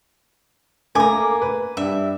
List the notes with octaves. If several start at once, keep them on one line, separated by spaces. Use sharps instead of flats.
A3 A#3 G#5 A#5 D6
B4
G2 G3 E5